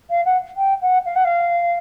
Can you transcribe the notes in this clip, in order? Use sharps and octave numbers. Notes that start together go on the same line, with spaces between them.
F5
F#5
G5
F#5
F5
F#5
F5